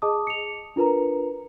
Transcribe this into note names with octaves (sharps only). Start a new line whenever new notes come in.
G#4 D#5 A5 D6 D#6
C#7 F7
D4 F4 A#4 B4 A#5